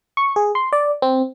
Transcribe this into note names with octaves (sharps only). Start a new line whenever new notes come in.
C#6
G#4
C6
D5
C4